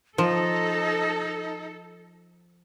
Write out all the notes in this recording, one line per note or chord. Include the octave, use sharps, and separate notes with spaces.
F3 D#4 A4